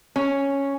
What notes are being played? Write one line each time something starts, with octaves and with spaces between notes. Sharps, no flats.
C#4